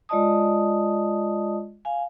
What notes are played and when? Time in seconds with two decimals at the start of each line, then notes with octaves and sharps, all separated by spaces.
0.09 G#3 F4 D5 D#5 A5 D#6
1.85 F5 G#5